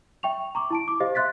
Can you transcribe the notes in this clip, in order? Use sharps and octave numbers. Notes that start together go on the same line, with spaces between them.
E5 G5 C#6 F7
A#5 C#6 D6
E4 A5 D7
D6
G4 C5 D#5 F5
E5 C6 F#6 A6 B6